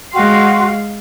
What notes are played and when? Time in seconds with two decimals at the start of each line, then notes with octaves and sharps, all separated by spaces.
0.13 G#3 F#4 F5 G5 C6